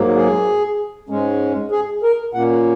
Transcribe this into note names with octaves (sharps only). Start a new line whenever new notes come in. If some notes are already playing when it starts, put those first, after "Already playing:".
Already playing: G#2 F#3 A#3
G#4
G#2 G#3 C#4
G#4
A#4
A#2 A#3 C#4 F#5